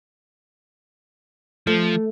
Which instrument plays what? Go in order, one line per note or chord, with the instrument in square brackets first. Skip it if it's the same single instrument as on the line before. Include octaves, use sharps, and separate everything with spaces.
[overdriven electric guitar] F3 [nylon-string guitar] A3